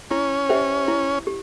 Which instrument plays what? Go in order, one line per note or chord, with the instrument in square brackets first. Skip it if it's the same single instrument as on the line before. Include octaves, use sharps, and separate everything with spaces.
[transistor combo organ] C#4 [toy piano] E4
[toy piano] G4 C5 E5 G5
E4
G4